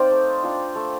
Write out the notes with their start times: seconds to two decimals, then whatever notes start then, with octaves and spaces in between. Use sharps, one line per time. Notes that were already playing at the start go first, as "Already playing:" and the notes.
Already playing: C4 D#4 C5 D5 F5
0.11 A3
0.43 D4 F4
0.75 A3